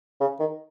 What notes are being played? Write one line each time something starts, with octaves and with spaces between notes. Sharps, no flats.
C#3
D#3